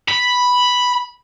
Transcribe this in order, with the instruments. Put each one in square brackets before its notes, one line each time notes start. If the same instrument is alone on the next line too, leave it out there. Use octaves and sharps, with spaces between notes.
[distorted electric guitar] B5